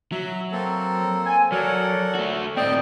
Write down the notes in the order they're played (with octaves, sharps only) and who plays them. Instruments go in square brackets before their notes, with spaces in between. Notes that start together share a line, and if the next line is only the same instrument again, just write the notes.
[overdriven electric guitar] F#3 [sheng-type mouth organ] E5
[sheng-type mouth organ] A#3 C4 A4
[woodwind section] G#5
[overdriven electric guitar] F#3 [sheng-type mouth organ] A4 F#5 [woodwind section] A#4 C#5 D5
[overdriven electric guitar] A3 F#4
[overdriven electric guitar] A2 C4 [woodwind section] D5 G5 [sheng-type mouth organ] D#5